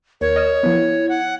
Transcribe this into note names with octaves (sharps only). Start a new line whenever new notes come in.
D#2 A#4 C#5
D#5 F6 E7
F3 B3 E4
F#5